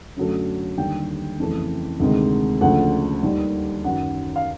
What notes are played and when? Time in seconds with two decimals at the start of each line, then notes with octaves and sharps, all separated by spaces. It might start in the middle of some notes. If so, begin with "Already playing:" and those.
0.16 F#2 D3 F#3 A3
0.77 D#2 D3 G3 G5
1.39 F2 C#3 E3 A3
2.00 D2 C3 D#3 G#3
2.61 D2 C#3 F3 A3 F#5
3.23 D#2 D#3 G3
3.84 F#2 D#3 F#3 F#5
4.36 F5